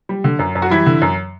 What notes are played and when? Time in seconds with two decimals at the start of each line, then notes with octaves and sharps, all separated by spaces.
0.09 G3
0.24 D3
0.39 F#2
0.55 F#2
0.62 F#4
0.70 E3 G3 E4
0.86 D3
1.02 F#2